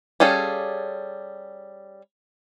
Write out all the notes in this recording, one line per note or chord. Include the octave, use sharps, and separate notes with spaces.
G3 C#4 G#4 A4 F5